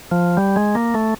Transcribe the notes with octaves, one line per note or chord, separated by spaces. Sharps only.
F3
G3
G#3
A#3
A3